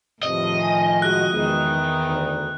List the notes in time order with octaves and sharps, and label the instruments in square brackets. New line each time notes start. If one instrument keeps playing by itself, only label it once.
[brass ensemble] E2 C3 [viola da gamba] A2 D#3 F3 [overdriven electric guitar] D#5
[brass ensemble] G#5
[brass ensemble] G#3 F#4 [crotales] F#6
[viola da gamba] E2 D#3 D#4 [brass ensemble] B2 F3 G#3
[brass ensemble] D2